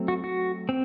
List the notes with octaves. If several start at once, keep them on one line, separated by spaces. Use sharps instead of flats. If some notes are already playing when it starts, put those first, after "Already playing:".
Already playing: F#3 A3 C4
F#4
F#4
C4